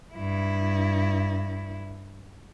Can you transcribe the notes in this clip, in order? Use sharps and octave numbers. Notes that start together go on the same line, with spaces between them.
G2 E4